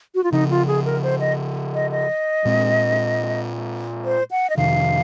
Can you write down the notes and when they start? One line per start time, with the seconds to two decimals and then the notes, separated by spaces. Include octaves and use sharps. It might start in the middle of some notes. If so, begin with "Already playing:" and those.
0.15 F#4
0.24 F4
0.32 C#3 F3 C4 D#4
0.50 F4
0.67 G#4
0.85 A#4
1.03 C5
1.20 D#5
1.74 D#5
1.91 D#5
2.45 A#2 G#3 C4
4.05 C5
4.31 F#5
4.50 D#5
4.57 F2 C3 D#3 F5